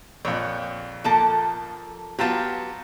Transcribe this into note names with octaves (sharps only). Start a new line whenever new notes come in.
A#1 F2 C#5
F3 A#3 A4
F#3 B3 F4 G4 A5